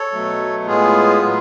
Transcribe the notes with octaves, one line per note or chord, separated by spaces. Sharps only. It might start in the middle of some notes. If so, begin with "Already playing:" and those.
Already playing: A4 C#5
B2 F#3 A3
A2 G#3 B3 F4 G#4
A2 F#3 B3